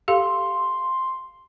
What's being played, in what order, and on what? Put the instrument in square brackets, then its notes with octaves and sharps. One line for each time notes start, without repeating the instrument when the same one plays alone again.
[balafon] G4 A4 F5 [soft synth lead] C6